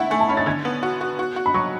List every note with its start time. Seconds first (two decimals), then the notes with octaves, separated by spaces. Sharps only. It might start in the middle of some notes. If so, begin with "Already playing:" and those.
Already playing: A3 E4 E5 F#5
0.10 A3 G#5
0.20 A5
0.29 C#4 B5
0.37 A6
0.46 D3 G#6
0.65 B3
0.83 F#4
1.01 F#4
1.19 F#4
1.36 F#4
1.46 B5
1.54 F#3 C#6